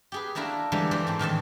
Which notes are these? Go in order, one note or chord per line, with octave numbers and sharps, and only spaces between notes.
G4 G#4 B4
A3 A#3 D4 E4 F#4
D3 E3 G3 G#3
E3 A3 C5 D5
G#2 C4
A2 D#3 E3 A5